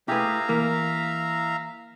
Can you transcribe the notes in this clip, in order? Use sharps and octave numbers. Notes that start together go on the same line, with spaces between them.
A3 E4 G4 G#4 B4 E5 F5 A#5
E3 A#3